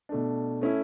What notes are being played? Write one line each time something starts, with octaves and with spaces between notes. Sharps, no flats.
B2 A3 D4
A3 C#4 E4